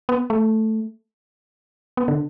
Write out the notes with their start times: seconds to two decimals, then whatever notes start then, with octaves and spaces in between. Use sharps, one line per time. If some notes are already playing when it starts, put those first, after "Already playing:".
0.09 B3
0.30 A3
1.97 B3
2.08 D3